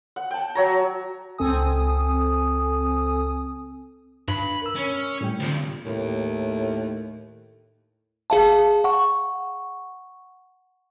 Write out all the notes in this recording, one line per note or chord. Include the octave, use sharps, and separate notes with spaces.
F#5
G5 A5
F#3 C#5 A#5
C#2 C4 A4 G#5 D#6
G2 B5
A#4 E6
C#4
A2 G3 G5
C2 D3 F3 G3
D#2 A2
G#4 F5 A5
F#5 C#6